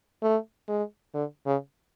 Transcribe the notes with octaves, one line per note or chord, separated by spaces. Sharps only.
A3
G#3
D3
C#3